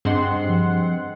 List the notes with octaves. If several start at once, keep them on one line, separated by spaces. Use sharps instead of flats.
G2 C4 G#4 D#5 F#5 C6
F3